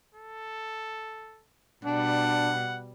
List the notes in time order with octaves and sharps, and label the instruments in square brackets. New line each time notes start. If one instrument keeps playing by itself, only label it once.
[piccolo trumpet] A4
[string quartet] B2 G3 [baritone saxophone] D4 [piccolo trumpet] F#5